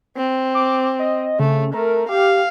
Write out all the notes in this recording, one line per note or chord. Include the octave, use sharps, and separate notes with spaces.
C4
D6
D#5
C#3 A3
A3 A#4
G4 F5